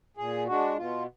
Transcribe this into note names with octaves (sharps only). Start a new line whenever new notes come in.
A#2 G#4
G#3 D4 F#4
B2 F4